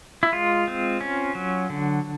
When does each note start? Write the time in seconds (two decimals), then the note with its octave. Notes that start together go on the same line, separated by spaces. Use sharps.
0.23 E4
0.32 G#3 F4
0.68 C4
1.01 C#4
1.35 F#3
1.70 D3